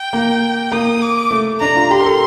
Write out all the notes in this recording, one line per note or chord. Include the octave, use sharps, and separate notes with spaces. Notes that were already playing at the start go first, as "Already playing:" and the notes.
Already playing: G5
A#3
A#3 D#6
D6
A3
D4 A#5
F4
G4 C6
A#4
A4